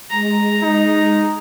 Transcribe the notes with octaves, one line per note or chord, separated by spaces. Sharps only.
G#3 A#5
D#4